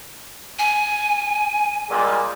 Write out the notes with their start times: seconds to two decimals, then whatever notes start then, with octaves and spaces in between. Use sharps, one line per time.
0.59 G#5
1.89 A#2 G3 G#3